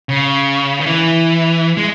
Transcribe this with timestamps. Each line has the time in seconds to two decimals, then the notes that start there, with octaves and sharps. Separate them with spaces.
0.09 C#3
0.80 D#3
0.86 E3
1.77 G#3